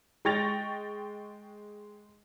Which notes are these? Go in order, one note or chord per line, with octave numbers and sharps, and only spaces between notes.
G#3 G5 C#6 A6 A#6 F7